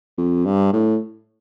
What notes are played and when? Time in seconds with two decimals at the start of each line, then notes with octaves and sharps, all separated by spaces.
0.18 F2
0.45 G2
0.73 A2